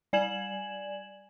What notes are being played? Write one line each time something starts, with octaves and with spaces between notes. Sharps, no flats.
G3 D5 G#5 G#6 E7 F#7